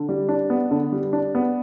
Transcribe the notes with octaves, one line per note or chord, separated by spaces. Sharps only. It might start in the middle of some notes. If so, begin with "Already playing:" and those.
Already playing: D3
G3
D4
B3
D3
G3
D4
B3